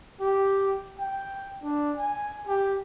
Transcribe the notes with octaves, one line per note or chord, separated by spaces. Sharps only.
G4
G5
D4
G#5
G4